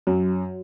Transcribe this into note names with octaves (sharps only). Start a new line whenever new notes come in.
F#2 F#3